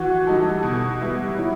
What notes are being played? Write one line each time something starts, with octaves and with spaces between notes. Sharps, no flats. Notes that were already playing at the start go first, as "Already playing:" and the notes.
Already playing: E3 F#4
G3 D#4 A4
B2
G3 B3 E4
F#3 E4